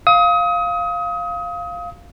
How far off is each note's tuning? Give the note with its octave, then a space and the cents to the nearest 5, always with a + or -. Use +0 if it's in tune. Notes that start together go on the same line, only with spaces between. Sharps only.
F5 +0 D#6 +30